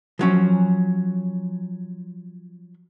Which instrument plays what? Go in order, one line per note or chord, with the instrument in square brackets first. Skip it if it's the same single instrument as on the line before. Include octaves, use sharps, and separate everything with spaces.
[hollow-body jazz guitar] F3 F#3 C#4